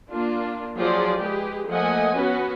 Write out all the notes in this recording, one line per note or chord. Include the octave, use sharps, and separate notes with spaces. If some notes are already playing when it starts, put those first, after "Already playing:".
A#3 D4 F4
F3 F#3 F4 G#4 C5 D5
G#3 G4 G#4 B4
F3 A3 A#3 D#5 F#5 G#5
B3 C#4 F#4 B4